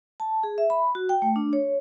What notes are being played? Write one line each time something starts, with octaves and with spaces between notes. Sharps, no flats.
A5
G#4
E5
B5
F#4
G5
A3
D4
C#5